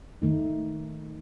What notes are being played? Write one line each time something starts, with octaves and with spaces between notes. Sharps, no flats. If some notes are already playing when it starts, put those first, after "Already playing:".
D#3 A3 D#4